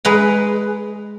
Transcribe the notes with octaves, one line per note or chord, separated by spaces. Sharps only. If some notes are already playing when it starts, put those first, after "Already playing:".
G#3 B4 A#5